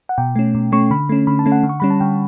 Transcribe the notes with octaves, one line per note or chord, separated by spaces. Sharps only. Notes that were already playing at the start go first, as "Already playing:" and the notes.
F#5
B2 G5
A3 C#4
B2
A3 C#4 C#6
D3 B5
A3 C#4
D3 B5
A5
A3 C#4
F#5
D3
C#6
G3 C#4 B5
A5
D3 G5